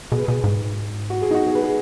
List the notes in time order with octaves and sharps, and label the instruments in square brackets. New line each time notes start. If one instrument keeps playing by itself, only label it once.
[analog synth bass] B2 [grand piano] G#4
[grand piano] B4
[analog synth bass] B2 [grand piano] G#4
[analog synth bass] G#2
[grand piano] F#4
G#4
D#4
F#4
G#4
B4
G#4